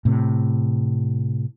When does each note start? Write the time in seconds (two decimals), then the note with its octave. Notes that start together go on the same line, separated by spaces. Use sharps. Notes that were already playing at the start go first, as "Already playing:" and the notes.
0.05 A2 C3